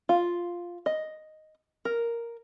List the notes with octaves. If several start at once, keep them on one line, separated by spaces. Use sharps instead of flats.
F4
D#5
A#4